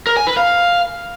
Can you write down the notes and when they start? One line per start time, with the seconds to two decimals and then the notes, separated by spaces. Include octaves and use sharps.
0.07 A#4
0.17 G#5
0.27 B4
0.37 F5